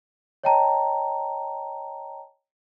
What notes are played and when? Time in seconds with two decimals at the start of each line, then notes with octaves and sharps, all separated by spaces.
0.44 C#5 D#5 G5 A5 A#5